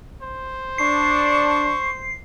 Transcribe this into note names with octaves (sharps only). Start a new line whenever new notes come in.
C5
D4 C#6 C7